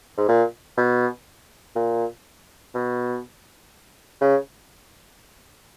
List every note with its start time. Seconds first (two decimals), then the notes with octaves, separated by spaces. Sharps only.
0.18 G#2
0.29 A#2
0.77 B2
1.75 A#2
2.75 B2
4.21 C#3